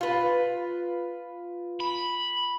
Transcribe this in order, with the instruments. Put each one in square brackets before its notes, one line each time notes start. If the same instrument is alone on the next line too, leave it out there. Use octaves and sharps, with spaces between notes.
[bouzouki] F4 B4
[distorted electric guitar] B5